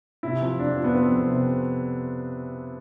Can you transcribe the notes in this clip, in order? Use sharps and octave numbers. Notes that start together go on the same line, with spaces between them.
C3 E4
F3
F2 D4
F3
B3
F3 C4
F2
C3